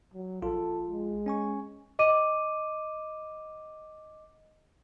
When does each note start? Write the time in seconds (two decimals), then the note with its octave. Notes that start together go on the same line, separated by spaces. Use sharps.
0.14 F#3
0.42 A#1 F4 A4
0.87 G#3
1.26 C#4 G#5 C#6
1.99 D#5 D6 D#7